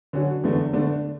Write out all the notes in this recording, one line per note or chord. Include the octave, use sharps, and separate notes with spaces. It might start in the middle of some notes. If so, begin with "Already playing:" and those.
D3 F#3 C#4 F#4
E2 D3 A3 D4
D3 A3 D4